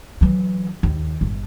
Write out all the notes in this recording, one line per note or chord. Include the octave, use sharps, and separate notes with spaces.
E3 F#3
D#2
G1